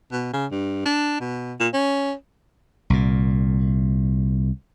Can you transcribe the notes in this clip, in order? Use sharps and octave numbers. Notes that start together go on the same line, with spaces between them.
B2
C#3
G2
D4
B2
A#2
C#4
C2 A#2